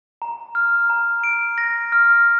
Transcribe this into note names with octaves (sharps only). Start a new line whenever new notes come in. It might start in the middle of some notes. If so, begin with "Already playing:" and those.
A#5
F6
A#5
D7
A#6
F6